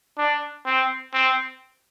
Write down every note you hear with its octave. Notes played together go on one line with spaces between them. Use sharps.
D4
C4
C4